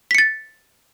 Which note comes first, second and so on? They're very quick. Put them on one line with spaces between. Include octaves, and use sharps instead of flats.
B6 C#7 A6